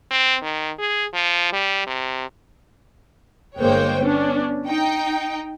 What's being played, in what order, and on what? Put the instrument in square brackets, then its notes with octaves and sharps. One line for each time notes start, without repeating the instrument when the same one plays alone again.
[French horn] C4
D#3
G#4
F3
G3
C3
[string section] G1 G#3 A#3 C5 C#5 G5
B3 C#4 D4
D#4 G5